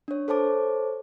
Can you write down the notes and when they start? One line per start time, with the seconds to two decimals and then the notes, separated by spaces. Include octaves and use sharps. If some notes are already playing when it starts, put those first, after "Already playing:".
0.08 D4 C#5
0.28 A4 C5 C#5 A5 D6